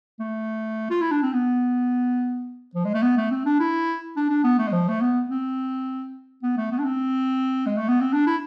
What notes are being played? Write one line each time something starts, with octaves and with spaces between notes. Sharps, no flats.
A3
F4
E4
D4
C4
B3
F3
G#3
A3
B3
A3
C4
D4
E4
D4
D4
B3
A3
G#3
F3
A3
B3
C4
B3
A3
B3
D4
C4
G#3
A3
B3
C4
D4
E4